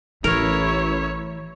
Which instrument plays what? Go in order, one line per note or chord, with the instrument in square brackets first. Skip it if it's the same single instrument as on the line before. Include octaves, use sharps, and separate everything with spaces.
[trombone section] A1 [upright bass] E3 A3 [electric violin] E4 C#5 [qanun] A#4